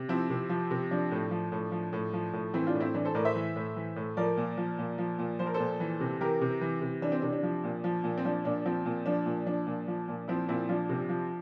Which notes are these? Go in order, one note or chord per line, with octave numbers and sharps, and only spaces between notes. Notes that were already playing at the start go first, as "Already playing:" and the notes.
Already playing: C3
F3 C4 E4
C3
F3
C3
F3 D4
A2
F3
A2
F3
A2
F3
A2
E3 C4 E4
D4 F4
A2
C4 E4
E3 D4
A4 C5
A2 A#4 D5
C5 E5
E3
A2
E3
A2
F3 A#4 D5
A#2
F3
A#2
F3
A#2
F3 C5
A#4
A4 C5
A#2
E3
C3
E3 G4 A#4
C3
E3
C3
E3 D4
C4
C3 D4
D4
F3
A#2
F3
A#2
C4
F3 D4
A#2 D4
F3 C4
A#2
F3 D4
A#2
F3 D4
A#2
F3
A#2
F3 C4 E4
A#2 C4 E4
F3 D4 F4
C3
F3